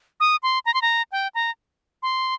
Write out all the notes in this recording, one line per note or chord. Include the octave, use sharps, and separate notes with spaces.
D#6
C6
A#5
C6
A#5
G5
A#5
C6